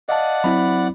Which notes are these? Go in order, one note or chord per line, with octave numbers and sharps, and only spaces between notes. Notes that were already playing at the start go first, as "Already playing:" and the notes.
D5 D#5 F5 F#5 A5
F#3 C4 E4 B5